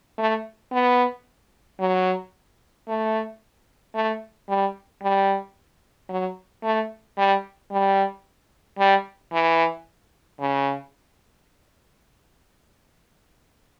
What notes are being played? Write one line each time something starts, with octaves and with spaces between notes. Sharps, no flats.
A3
B3
F#3
A3
A3
G3
G3
F#3
A3
G3
G3
G3
E3
C#3